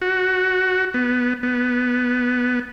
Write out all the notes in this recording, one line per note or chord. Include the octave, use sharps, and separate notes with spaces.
F#4
B3
B3